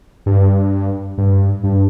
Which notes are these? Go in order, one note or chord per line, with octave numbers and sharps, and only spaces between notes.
G2
G2
G2